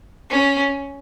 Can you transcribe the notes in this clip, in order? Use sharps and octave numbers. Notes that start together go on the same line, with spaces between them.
C#4